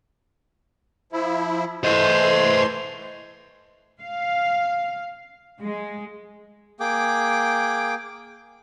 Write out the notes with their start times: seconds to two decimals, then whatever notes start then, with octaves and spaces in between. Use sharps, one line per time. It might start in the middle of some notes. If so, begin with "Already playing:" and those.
1.12 F3 E4
1.84 E3 A3 C5 D#5 C6
3.99 F5
5.60 G#3
6.80 A#3 G#4 G5 D6